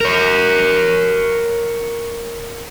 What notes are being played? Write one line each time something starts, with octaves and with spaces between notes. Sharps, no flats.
A#4 C#5